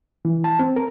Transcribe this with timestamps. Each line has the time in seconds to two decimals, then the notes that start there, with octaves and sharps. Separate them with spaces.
0.25 E3
0.44 A5
0.59 C4
0.76 A#4